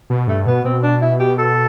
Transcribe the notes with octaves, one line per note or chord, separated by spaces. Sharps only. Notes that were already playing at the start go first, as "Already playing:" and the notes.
B2
G2 A3
B2 B3
B2 C4
D4
E4
G4
A4